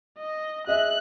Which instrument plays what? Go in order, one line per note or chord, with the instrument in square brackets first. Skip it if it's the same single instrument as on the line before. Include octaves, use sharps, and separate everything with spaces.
[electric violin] D#5
[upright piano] G#4 D#5 E5 [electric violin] F#6